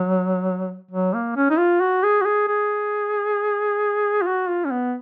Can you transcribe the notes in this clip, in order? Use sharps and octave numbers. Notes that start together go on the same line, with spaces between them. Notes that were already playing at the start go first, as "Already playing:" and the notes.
Already playing: F#3
F#3
A#3
C#4
D#4
F4
F#4
G#4
F#4
G#4
G#4
F4
F#4
F4
C#4
B3